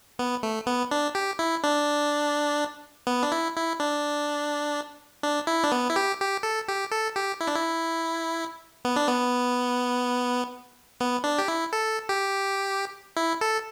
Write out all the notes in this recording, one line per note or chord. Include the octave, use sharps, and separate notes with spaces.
B3
A3
B3
D4
G4
E4
D4
B3
D4
E4
E4
D4
D4
E4
D4
B3
E4
G4
G4
A4
G4
A4
G4
E4
D4
E4
B3
D4
B3
B3
D4
G4
E4
A4
G4
E4
A4